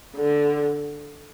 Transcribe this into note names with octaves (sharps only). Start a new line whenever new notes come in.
D3